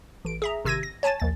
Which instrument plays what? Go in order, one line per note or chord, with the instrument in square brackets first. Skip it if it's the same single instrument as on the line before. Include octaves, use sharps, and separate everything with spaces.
[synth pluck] A1 D7
G#4 E5 A#5
G#1 C3 E6 G#6 A#6 D#7
A#6
C#5 G#5 A5 A6
A#1 D#2 A6